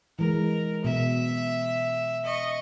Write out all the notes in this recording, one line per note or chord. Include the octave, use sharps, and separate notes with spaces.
E3 G#3 A#4
B2 E5
D#5 C#6